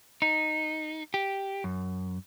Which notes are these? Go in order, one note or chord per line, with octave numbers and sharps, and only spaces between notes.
D#4
G4
F#2